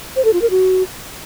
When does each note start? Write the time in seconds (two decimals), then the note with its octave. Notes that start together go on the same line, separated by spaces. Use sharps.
0.16 C5
0.25 A4
0.33 F4
0.42 A#4
0.50 F#4